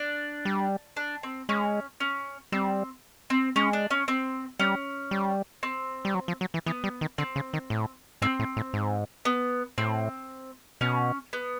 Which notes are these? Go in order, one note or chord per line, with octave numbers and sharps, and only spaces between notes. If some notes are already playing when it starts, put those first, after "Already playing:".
Already playing: D4
G3
D4
C4
G#3 C#4
C#4
G3 C4
C4
G#3 C#4
D4
C#4
C4
G3 C#4
G3
C4
G3
F#3
F3
F#3
E3
E3 B3
G3
D#3
D3 C4
C#3
D#3
A2
G#2 C4
A2
A2
G#2
B3
A2 C4
B2 C#4
B3